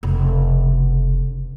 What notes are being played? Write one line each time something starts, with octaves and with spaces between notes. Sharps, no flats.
F1 C#3